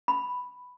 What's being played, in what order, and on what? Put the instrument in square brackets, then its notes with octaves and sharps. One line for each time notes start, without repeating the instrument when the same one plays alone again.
[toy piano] B5